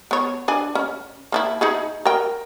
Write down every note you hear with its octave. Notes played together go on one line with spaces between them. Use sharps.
B3 C#5
D4 D5 G#5
C#4
A#3 D4 E4
D#4 E4 G#4
A#4 G5